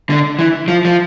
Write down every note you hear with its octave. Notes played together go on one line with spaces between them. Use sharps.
D3
E3
F3
F3